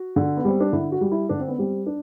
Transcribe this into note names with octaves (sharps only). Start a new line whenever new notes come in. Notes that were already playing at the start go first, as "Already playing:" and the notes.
Already playing: F#4
D3
B3
G3 C4
D4
D3 E4
F#4
G3
E4
D3 D4
C4
B3
G3 C4
D4